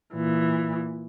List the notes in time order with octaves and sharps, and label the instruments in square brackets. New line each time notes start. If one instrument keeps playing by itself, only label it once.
[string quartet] A#2 E3